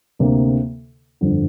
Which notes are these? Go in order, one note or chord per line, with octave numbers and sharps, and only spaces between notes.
D2 C3 A#3
G1 F2 D3